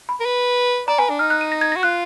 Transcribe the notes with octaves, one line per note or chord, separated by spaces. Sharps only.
B5
A#4
B4
D5 A#5
B4 G#5
D4
D#4 F6
F#6
D#7
A#6
G#6
F#4 A#6
F4 F#6